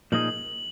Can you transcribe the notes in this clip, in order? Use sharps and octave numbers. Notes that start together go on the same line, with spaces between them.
A#2 F3 A#3 D#4 G#4 F#7